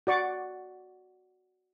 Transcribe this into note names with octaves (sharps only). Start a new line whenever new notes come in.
F#4 D5 C#6 D6